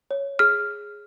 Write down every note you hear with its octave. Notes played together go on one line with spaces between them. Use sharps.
C#5
G#4 F6